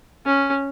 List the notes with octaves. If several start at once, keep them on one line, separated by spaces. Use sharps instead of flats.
C#4